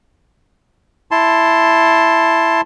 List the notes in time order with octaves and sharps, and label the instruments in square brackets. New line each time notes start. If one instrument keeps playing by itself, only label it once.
[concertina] E4 A5 C6